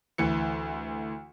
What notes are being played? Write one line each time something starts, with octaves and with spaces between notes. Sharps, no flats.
D2 E3 C#7